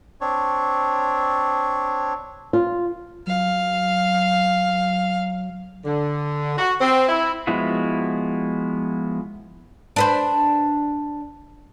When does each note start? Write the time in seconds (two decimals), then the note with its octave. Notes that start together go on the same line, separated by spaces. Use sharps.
0.21 C4 D4 C#5
2.53 F4
3.27 F#3 F5
5.85 D3
6.57 F#4
6.80 C4
7.09 E4
7.47 F3 G#3 B3 E4 F#4
9.96 D4 B4 C5